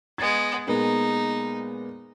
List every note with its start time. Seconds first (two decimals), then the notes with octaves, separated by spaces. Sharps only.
0.18 G#3 B3 G#6 A6
0.67 A#2 G#3 B3 D#4